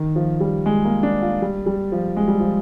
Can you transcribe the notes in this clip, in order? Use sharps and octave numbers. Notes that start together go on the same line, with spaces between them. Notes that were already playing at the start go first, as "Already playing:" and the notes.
Already playing: D#3
F3
G3
G#3
A#3
D4
F4
G3
G3
F3
G#3
G3
F3